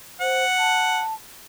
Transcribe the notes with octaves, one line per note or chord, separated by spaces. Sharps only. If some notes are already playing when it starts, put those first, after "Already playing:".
C5 F#5
A5